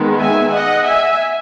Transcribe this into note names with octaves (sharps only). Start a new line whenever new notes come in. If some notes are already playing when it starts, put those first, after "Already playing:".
Already playing: D#3 G#3 B3
E5 G#5
D#5 F#5
E5 G#5